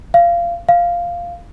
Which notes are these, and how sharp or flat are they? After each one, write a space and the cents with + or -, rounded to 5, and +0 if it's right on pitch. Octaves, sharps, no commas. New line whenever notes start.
F5 -20
F5 -5